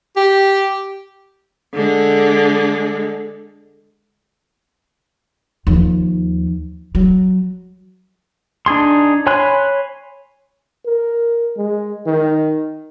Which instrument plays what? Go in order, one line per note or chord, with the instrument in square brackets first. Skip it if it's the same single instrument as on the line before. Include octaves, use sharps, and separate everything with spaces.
[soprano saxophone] G4
[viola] D3 G#3
[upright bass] D#2 F3
F#3
[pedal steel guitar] D4 D#4 G#4 C6
C#5 G#5 B5 C6 F#6
[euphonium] A#4
G#3
D#3